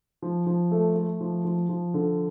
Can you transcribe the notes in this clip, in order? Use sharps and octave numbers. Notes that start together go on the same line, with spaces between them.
F3
F3
A3
A3
F3
F3
F3
D3